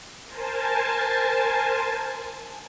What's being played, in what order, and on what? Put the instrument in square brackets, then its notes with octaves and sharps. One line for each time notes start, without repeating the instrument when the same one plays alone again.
[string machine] A#4 C5 G#5 A5